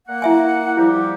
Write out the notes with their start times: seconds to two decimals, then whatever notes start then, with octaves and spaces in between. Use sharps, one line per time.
0.08 A#3 F#5
0.22 E4 E5 G#5
0.77 F3 G3 E4 G4